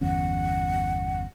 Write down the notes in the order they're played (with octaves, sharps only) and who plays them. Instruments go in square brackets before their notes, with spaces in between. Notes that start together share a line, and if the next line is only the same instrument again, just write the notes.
[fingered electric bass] G1 E2 C#4 [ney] F#5